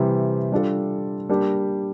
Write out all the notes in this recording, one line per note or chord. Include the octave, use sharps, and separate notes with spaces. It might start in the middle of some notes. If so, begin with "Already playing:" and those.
Already playing: C3 E3 G3
G3 D4 F4 A4
G3 A#3 D4 G4